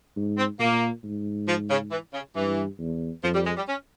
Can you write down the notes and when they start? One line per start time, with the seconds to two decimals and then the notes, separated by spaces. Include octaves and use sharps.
0.16 G#2
0.37 C4
0.59 A#2 A#3
1.04 G#2
1.48 F3
1.70 C#3
1.91 E3
2.13 C#3
2.35 G2 E3
2.79 E2
3.23 F2 F3
3.34 G3
3.45 G#3
3.57 G3
3.68 C#4